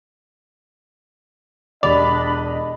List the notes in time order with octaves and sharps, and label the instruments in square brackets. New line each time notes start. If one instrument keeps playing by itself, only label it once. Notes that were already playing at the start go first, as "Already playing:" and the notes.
[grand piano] E1 G4 F7 [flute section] D4 B5 [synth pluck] D5 [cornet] D#5